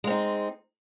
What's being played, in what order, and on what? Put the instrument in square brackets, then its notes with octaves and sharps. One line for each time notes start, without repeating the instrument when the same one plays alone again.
[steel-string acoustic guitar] G#3
C4
D#4